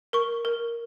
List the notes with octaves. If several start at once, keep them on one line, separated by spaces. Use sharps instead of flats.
A#4 C#6
A#4